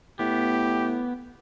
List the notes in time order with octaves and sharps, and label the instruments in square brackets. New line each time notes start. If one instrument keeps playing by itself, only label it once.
[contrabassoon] A2 [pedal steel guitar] B3 [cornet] G4